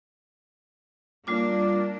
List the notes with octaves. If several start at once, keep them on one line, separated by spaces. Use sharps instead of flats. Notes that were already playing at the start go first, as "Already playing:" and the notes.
G3 A#3 D4 F4 D6